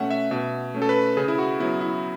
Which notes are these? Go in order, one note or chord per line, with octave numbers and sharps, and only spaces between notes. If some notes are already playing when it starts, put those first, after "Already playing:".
Already playing: B2 A3 C#4 E5 F#5
E5
B2 E5
A3 C#4
A4
B4
C#3 G#4
E4
F#4
F#3 B3 E4
E4